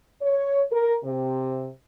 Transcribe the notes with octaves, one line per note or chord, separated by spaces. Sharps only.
C#5
A#4
C3